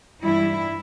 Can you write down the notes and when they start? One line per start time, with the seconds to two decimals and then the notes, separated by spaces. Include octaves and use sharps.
0.22 G2 E3 G3 E4